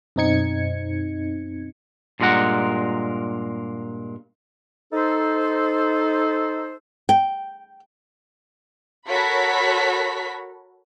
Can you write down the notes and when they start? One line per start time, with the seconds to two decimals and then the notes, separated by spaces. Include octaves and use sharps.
0.16 F#2 B2 C4 D#4 G#6 C#7
2.20 G2 A#2 G#3 A#4 F#5
4.93 D#4 A4 C5
7.09 G5
9.10 F#4 A4 A#4 C#5 B5 B6